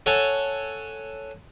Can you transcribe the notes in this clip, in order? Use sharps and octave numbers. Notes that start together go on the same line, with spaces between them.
A4 C#5 F#5 G#5 A5